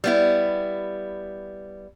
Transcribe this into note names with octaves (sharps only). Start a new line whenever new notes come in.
G3 B3 E4